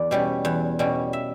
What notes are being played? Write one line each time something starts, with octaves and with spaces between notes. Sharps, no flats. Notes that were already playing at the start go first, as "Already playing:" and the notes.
Already playing: E2 D5
B2 G3 C#4
E2
B2 G3 C#4
E5